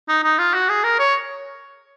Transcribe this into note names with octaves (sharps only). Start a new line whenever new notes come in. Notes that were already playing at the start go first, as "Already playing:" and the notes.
D#4
D#4
F4
F#4
G#4
A#4
C#5